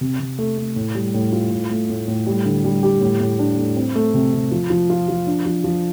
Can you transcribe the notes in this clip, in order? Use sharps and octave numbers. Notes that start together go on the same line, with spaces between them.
C3
C3
A3
A3
A2
G3
A2
F4
A2
A3
A2
A2
G3
D3
G3
G4
A2
A2
D4
A2
C4
A3
C3
C3
F3
F3
F4
F3
D4
F3
F3